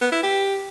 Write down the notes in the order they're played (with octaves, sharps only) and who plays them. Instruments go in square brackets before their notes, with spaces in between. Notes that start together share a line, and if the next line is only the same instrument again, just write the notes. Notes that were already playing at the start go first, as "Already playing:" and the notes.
[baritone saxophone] B3
E4
G4